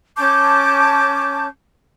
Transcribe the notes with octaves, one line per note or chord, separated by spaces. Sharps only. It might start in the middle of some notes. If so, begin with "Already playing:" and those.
C#4 A5 D6 G6